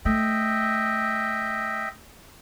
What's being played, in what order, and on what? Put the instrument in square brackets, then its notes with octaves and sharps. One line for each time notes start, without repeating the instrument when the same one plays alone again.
[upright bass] A3 [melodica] D#5 E5 G5